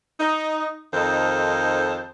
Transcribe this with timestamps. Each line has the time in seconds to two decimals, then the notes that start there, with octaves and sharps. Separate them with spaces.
0.20 D#4
0.94 F2 D#3 D#4 A4 C5